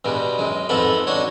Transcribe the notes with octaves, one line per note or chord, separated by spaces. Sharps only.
G2 B2 G3 G#3
F#2 G#3
F2 G#2 B3 C4 A4 B5
D4 D#4 F#4 C#5